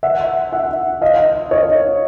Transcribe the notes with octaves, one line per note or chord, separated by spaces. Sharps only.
E5 F#5
E5 F#5
D#5 F5
C#5 D#5